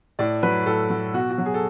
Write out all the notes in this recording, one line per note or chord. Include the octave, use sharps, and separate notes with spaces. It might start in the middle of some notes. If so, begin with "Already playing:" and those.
A2 D5
F#3 B4
A2 A4
F#3
B2 F#4
F#4
F#3
G#4
A4